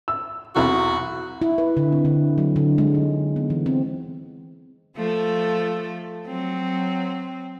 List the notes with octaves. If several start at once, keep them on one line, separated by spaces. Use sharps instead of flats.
E6
B1 E2 C3 F#4
E4
B4
D3
C4
D3
F#3
D3
G#3
D#4
B3
E3
C4
F3 A3 A4
F#3 C4